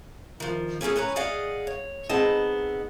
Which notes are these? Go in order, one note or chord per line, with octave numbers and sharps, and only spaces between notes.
D#3 F3
A#3 C#4 D4 G#4 A4
C#4 B4 C#5 A#5
G#4 D5 D#5 F5 F#5 G#5
C#5
B3 C4 D#4 G#4 D#5 A5